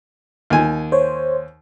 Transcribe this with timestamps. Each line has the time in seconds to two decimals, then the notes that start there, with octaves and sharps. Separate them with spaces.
0.50 D#2 G#5
0.92 C5 C#5